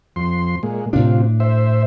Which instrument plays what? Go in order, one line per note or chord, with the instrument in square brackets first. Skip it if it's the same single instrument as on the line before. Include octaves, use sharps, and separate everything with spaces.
[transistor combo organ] F2 C6
A#2 G#3
[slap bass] A2 D4 [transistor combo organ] C3 F4
[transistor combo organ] C5 E5